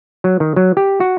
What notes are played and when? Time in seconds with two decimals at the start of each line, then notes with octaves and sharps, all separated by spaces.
0.24 F#3
0.40 D#3
0.56 F#3
0.77 G4
1.00 F#4